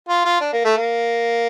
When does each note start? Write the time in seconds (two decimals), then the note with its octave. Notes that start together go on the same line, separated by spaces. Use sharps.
0.09 F4
0.25 F4
0.41 D4
0.53 A#3
0.64 A3
0.77 A#3